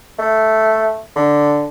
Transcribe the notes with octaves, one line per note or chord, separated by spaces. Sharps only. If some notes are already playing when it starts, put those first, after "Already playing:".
A3
D3